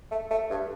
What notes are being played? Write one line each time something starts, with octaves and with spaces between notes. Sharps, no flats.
A3
A3
G2